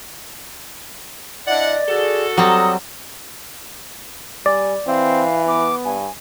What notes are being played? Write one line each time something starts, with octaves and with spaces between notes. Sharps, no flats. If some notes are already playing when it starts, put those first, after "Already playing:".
D4 E4 D5 D#5 F#5
F#4 G#4 A4
F#3 G3 C4 A#5 D#6
G3 D5 G#5
E3 C4 F5
B3 D6
G2 G#5